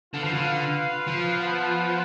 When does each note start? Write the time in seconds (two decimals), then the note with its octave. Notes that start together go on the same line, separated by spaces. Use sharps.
0.13 D3 F4 B4 F5
0.24 F3
0.33 D3
1.08 F3
1.38 B3 F4 B4 F#5